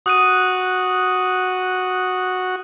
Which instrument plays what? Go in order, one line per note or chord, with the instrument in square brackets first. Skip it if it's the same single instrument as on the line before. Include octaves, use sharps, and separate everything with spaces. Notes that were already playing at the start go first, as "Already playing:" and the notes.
[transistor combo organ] F#4 [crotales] D#6 F#6 D#7